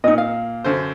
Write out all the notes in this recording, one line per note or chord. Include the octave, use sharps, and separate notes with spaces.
A#2 D#4 D#5
F5
F#2 D3 C5